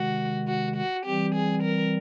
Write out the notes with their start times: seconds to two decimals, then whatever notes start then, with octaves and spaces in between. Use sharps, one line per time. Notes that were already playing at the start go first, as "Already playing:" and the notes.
Already playing: C3 D#3 G#3 F#4
0.48 F#4
0.76 F#4
1.05 E3 G3 C4 G4
1.34 G#4
1.63 A#4